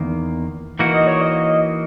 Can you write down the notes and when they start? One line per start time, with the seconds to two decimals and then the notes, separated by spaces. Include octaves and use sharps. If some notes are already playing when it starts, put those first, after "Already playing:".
Already playing: E2 D#3 A#3
0.79 E3 A#3 D#4 F#4
0.93 D#5
1.07 C#5
1.21 D#5